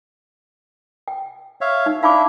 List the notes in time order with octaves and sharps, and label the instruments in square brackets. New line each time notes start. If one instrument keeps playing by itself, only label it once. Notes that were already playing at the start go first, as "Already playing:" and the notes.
[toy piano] G5
[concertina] C#5 E5 F5
[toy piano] D#4
[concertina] D4 E4 E5 [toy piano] F5 B5 D6